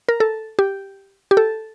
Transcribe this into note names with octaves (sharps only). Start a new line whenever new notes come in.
A#4
A4
G4
G4
A4